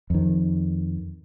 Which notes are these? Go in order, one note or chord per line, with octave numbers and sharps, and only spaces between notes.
F2 D#3